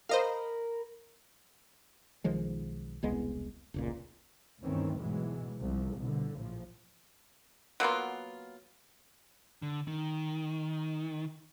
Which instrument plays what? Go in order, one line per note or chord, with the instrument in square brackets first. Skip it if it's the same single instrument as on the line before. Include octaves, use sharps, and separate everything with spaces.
[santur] A#4 B5 [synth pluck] C5 D#5 F5
[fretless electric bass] B1 D#3 F3 G#3
E1 C2 G#3 B3
F1 C#2 A#2
[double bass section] D2 G2 D#3 E3 C4 C#4
G#2 B2 E3 F#3 G#3
C2 F3
C2 B2 D3
A#1 A2 F3
[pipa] F#3 A#3 B3 F4
[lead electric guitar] D3
D#3